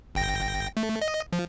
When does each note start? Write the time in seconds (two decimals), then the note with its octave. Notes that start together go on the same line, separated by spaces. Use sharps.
0.15 G1 G5 A#6
0.77 A3
1.02 D#5
1.33 F3